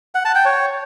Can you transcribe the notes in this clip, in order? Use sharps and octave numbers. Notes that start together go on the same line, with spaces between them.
F#5
A5
G5
C#5